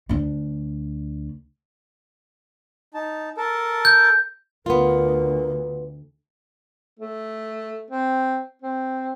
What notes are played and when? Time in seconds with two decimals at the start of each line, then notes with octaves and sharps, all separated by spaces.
0.09 D2 D4
2.94 D#4 A5
3.37 A4 A#4 A5
3.85 G6
4.66 D2 B3 F4 A#4
6.99 A3
7.91 C4
8.62 C4